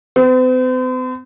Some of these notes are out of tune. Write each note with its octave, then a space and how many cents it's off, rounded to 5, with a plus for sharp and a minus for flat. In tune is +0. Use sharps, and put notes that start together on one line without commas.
C4 -45